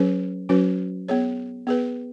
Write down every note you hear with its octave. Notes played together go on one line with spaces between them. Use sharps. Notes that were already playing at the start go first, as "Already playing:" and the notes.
Already playing: F#3 C#4 G#4 B4
F#3 C#4 F#4 B4
B3 G#4 C#5
B3 G#4 B4